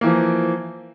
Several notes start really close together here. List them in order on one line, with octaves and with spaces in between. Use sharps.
A#3 E3 F3